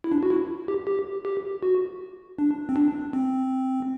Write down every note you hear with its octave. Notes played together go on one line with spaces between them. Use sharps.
E4
D4
F#4
E4
G4
G4
G4
F#4
D4
C4
D4
C4